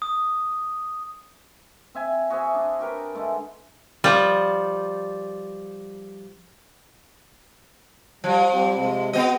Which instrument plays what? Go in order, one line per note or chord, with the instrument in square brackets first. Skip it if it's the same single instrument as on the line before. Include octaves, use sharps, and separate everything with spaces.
[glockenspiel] D#6
[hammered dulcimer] C4 E5 G#5
F#4 G#4 C5 E5
D4 G#4
F#4 G4 A#4 B4
D3 G#3 A3
[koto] F3 G3
[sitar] F3 [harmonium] G3
[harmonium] G3 C4 G4
C3 G#3 C4
[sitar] B3 D#5 [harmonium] F#4 G#4